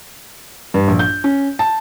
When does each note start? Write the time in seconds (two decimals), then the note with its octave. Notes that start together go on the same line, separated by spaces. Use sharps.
0.74 G2
0.88 A#1
0.99 G6
1.24 C#4
1.59 A5